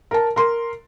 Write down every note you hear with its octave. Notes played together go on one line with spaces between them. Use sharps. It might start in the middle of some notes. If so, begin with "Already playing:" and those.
A#4 A5
A#4 C6